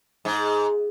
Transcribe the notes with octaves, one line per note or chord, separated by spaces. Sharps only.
G#2